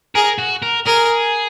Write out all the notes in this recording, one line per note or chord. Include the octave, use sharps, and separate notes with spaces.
G#4 A#4
F#4
A#4
G#4 A#4